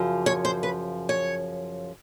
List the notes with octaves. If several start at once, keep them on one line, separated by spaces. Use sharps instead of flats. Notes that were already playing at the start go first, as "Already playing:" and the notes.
Already playing: F#2 C#3 F3
C#5
C5
B4
C#5